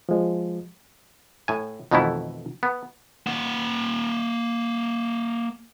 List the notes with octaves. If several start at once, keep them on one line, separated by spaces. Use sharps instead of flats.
F3 G#3
A2 G#5
F2 B2 D#3 E3 A3 E4
B3
A#3 F#5